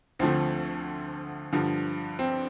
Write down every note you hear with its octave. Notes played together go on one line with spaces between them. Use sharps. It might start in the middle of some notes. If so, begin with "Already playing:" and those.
D2 D3 F3 A3 C4
G2 D3 F3
C4